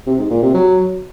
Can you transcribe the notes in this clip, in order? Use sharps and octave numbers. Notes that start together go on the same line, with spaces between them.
C3
G#2
A#2
C3
F#3